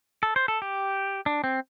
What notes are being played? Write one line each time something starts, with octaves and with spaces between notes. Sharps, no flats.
A4
C5
A4
G4
D4
C4